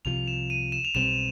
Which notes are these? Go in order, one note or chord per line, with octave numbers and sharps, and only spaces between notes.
C2 C3 F3 F7
E7
D#7
E7
F7
B1 B2 G3 C4 E7